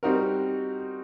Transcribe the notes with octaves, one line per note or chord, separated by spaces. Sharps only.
G3 C4 D#4 F#4 A#4